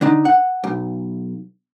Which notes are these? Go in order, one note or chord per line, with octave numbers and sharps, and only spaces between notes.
D3 D4 D#4
F#5
B1